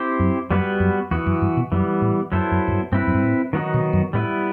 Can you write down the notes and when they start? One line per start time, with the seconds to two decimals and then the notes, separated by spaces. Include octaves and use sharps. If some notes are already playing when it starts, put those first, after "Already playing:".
Already playing: C4 E4 G4 C5
0.20 F#2
0.50 F#2 G3 B3 F#4 B4
0.80 F#2
1.11 E2 E3 B3 F#4
1.26 F#2
1.42 G2
1.57 B2
1.72 F#2 E3 G3 B3
2.02 A2
2.32 F#2 F#3 B3 E4 A4 C5
2.52 F#2
2.68 F#2
2.72 G2
2.92 G2 C4 E4 B4
3.07 F#2
3.14 G2
3.23 A2
3.53 D#3 F#3 B3 D#4 F#4
3.74 B2
3.93 F#2
4.13 A2 G3 B3 E4 B4